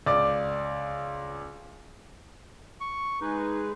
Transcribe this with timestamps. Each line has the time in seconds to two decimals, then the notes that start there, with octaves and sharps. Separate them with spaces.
0.06 C#2 D5 D6
2.81 C#6
3.21 G#3 D#4 G#4 B4